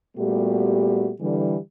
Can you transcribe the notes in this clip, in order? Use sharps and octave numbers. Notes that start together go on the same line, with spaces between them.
A#2 G3 A3 B3 F#4 G4
D3 E3 G3